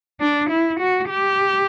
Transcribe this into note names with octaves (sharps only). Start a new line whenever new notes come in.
D4
E4
F#4
G4